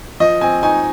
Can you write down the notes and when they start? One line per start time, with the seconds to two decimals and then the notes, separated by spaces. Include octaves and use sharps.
0.20 F3 D#5
0.41 C4 G#5
0.63 D#4 G#5